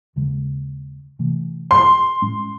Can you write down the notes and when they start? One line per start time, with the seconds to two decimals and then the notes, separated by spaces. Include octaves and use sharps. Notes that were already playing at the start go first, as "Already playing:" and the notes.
0.16 D#2 C#3 G#3
1.19 C3 E3 A3
1.71 C6
2.22 A2 G#3 C#4